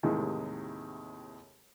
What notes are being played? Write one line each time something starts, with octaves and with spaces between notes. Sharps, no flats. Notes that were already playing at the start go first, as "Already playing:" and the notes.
D#2 A2 C3 D#3 E3 G#3